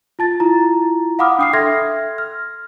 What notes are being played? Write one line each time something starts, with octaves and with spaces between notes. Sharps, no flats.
F4 A5 A6
E4 F4 A#5
F5 F#5 B5 D6 D#6 F6
D4 G5 D#6 F6 C7
A4 E5 C6 F6 G#6 A#6
F6